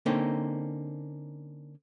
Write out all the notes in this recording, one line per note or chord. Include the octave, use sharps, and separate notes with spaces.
D3 A#3 C4 C#4 D#4